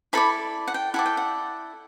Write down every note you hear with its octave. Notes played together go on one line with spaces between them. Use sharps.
E4 A4 D5 B5
F#5
G5
E4 A4 D5 F#5
G5
F#5